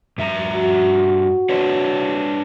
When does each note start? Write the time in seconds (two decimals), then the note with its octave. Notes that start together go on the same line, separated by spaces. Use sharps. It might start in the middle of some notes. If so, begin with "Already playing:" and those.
0.18 G2 E5 A#5
0.55 F#4
1.49 D4 B4 C#5